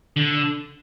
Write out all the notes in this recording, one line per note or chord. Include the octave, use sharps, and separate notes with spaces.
D3